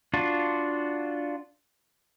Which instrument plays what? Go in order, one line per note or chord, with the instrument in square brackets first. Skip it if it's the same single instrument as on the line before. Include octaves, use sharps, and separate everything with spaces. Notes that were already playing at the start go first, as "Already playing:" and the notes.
[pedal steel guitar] D4 F4 F#4